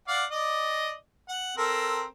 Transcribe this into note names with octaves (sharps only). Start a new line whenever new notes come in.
D5 F5 F#5
D5 D#5
F#5
C4 A4 A#4